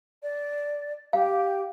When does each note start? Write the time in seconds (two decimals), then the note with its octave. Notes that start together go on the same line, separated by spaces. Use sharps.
0.23 D5
1.13 G4 F5